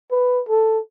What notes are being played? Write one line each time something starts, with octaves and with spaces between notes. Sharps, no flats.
B4
A4